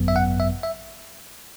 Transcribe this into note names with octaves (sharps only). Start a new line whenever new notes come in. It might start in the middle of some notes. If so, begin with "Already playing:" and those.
Already playing: G#1 F#2 F#3 B3
E5
F#5
E5
E5